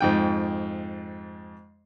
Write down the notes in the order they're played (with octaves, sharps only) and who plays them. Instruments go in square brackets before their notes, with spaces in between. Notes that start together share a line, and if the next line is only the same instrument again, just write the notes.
[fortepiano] F2 G#2 G5